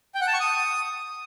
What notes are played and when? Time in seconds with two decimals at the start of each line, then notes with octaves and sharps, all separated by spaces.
0.15 G5
0.21 F#5
0.27 A5
0.34 C#6
0.40 D#6